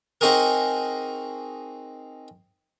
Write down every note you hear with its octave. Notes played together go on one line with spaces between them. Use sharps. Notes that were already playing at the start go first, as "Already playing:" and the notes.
C4 D#4 F#4 G#4 A#4